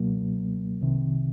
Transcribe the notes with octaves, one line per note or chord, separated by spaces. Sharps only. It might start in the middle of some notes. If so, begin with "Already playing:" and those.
Already playing: C#2 B2 F#3 A#3
C2 C3 D#3